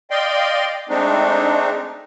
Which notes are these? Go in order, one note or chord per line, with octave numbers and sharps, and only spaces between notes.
D5 D#5 F5 G5 C6
G#3 A3 C4 D4 D#4